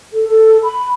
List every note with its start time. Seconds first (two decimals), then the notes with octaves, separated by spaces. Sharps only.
0.13 A4
0.28 A4
0.64 B5